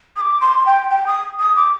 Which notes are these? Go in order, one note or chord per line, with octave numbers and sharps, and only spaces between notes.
D#6
D6
C6
G5
G5
D#6
D#6
D6